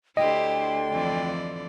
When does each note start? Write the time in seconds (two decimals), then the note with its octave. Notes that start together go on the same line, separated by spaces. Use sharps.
0.17 D2 D3 E4 G4 C5 D#5 G5 C6
0.92 F2 E3 D5